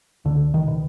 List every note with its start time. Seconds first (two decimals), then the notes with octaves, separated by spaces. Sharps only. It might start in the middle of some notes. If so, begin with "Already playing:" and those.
0.25 C#2 D3
0.54 D#3
0.68 B2